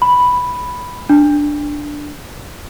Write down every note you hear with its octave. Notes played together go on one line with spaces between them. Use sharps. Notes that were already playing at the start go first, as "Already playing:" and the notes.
B5
D4